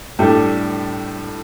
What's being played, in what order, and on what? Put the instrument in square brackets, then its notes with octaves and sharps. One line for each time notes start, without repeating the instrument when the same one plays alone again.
[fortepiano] A2 G3 D4 A4